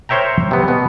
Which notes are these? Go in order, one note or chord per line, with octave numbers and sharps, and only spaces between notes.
A#4 C5 C#5 E5 G5 A#5
C3 B3
B2 B3